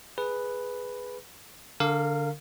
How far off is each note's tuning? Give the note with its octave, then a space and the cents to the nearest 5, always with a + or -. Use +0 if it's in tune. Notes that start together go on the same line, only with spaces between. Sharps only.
G#4 +0 B4 +0
D3 -10 A#4 -35 F5 +0